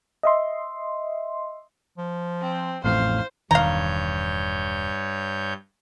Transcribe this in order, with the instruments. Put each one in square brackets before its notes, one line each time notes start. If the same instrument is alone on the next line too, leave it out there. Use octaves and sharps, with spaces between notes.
[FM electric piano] D#5 E5 C6
[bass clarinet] F3
[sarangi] C4
[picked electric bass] A1 F2 A2 [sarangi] C5 [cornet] F5
[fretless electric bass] E1 D#3 [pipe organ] G2 C#5 G6 [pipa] F5 A#5